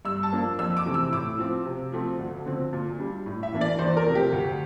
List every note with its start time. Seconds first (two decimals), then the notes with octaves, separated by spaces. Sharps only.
0.05 G2 E6
0.23 A5
0.32 F3 A#3 D4
0.59 F2 E6
0.77 D6
0.86 C3 E3 A3 C4
0.94 E6
1.12 A2 D6
1.38 F3 C4
1.66 C3
1.92 F3 A3 C4
2.19 D2
2.46 D3 F3 C4
2.73 A#2
2.99 G3 D4
3.26 A2
3.43 E5
3.53 E3 A#3 D4
3.61 D5
3.79 E2 C5
3.97 A#4
4.06 C3 F3 A3 C4
4.15 G4
4.32 D2